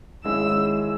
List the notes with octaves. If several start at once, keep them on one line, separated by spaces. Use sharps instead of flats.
G#1 G#2 G#3 C#4 E4 E6